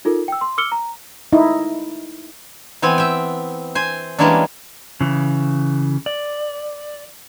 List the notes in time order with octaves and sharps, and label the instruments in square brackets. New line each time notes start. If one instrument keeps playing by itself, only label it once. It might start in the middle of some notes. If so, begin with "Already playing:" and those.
[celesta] D#4 F4 A4 A#4
G5 E6
C6
D6 E6 F6 C#7 G7
A#5
[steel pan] D#4 E4
[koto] E3 B3 C4 G#5
E5 G5
C5 G#5
E3 G3 G#3 A#3 C#4 D4
[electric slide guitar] C#3 E3
D5